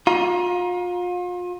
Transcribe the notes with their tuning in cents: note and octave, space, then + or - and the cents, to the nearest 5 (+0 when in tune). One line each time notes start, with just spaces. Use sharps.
F4 +35 A#5 +30